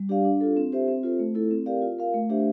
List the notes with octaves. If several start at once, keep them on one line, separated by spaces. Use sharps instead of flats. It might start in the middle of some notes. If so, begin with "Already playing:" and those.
Already playing: G3
D4 G4 D5 F5
D4
F4 A4
C4
G4 C5 E5
C4
F4 A4 C5
A3
E4 A4
C4
G4 A#4 D5 F5
F4
A#4 F5
A3
D4 G4 C5 E5